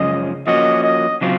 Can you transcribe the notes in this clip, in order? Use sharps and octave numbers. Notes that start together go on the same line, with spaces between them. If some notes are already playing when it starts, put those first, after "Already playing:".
Already playing: F#2 C#3 F3 G#3 C#4 D#5
F3 A#3 C#4 F#4 D#5
D#5
C#3 F#3 C4 F4